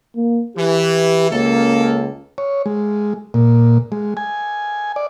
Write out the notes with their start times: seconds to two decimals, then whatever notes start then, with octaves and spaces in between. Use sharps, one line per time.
0.16 A#3
0.57 E3 G4
1.31 C#2 A#3 C#4 A4
2.38 C#5
2.66 G#3
3.34 A#2
3.92 G#3
4.17 G#5
4.96 D5